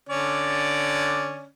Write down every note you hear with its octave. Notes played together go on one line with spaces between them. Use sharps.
D3 C#4 D5